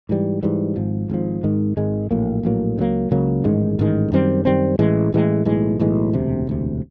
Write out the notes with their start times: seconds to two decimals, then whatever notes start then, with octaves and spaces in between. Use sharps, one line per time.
0.09 G#2 E3 G3
0.43 G#2 E3 G3
0.76 G#1 G#2 F3
1.10 G#1 G#2 F3
1.43 G#1 G#2 D#3 G#3
1.77 G#1 G#2 D#3 G#3
2.11 A#1 A2 F#3 A#3
2.43 A#1 A2 F#3 A#3
2.78 C#2 C#3 F#3 A#3
3.11 C#2 C#3 F#3 A#3
3.44 A1 G#2 D#3 G#3
3.79 A1 G#2 D#3 G#3
4.12 F#2 D#3 G3 C4
4.45 F#2 D#3 G3 C4
4.79 A1 A2 E3 G#3
5.12 A1 A2 E3 G#3
5.45 B1 A2 E3 G#3
5.79 B1 A2 E3 G#3
6.13 E1 D2 C3
6.47 E1 D2 C3